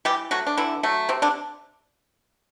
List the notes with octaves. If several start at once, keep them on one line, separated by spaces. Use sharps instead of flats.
E3 G3 G4
F#3 A3 F#4
D4
D3 E3 E4
F#3 A3
C3 C4
D3 D4